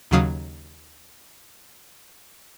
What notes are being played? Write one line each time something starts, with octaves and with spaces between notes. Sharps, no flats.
D#2 C#3 F#3 F5 D#6